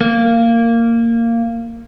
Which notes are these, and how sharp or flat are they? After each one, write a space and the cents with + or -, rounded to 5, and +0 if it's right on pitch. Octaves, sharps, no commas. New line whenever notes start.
A#3 -15